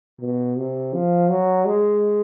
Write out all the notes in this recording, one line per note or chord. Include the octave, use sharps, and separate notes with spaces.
B2
C3
F3
F#3
G#3